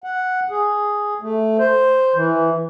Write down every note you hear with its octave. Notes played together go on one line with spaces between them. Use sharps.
F#5
G#4
A3
C5
E3